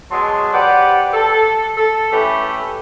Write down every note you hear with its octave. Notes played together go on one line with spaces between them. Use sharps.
B2 F#3 G#3 G#4 A5 C6
G4 B4 C5 D5 F#5
A4
A4
E3 A3 C#4 G4 B4